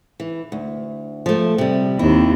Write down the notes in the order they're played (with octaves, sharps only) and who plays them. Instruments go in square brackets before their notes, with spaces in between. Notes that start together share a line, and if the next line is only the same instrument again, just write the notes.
[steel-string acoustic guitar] E3
D2
F3 A3
C3 G3
[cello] D#2 C4 [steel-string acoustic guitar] E4